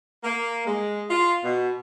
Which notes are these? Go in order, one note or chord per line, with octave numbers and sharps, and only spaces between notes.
A#3
G#3
F4
B2